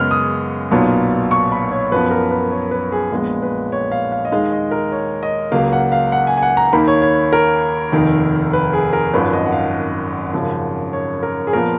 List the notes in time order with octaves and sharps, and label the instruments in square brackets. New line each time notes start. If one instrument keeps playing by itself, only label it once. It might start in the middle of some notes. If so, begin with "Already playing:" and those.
Already playing: [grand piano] F#2 C#3 G#3 B3 F6
D#6
B1 A#2 F#3 B3
C#6
B5
C#5
F#2 F3 B3 B4
A#4
B4
C#5
B4
G#4
A#1 A#2 G#3 B3
B4
C#5
F5
F5
D#5
D#2 D#3 G#3 F5
D#5
A#4
C#5
D#5
C#2 C#3 F#3 A#3 F5
F#5
F5
F#5
G#5
G#5
F#5
A#5
D#2 D#3 A#3 B5
C#5
C#5
A#4
F1 D#2 D#3
B4
G#4
A#4
G#1 F#2 F3 B4
D#5
F#5
F5
G#1 F#2 C#3 F3
C#5
A#4
G#4
A#2 F3 B3 A#4